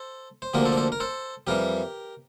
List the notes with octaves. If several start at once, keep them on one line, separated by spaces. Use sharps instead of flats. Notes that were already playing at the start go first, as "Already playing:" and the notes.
Already playing: A4 C5
C5
D2 D3 F3 A#3 G4 A#4
A4 C5
D5
A4 C5
A#4
A4 C5
F2 E3 G3 G4 A#4